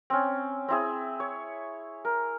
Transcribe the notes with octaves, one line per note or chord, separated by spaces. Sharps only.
C4 C#4
C4 E4 G#4
C#5
A#4